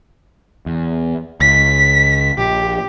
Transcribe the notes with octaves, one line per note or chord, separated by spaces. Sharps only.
E2
C#2 B6
A#1 G4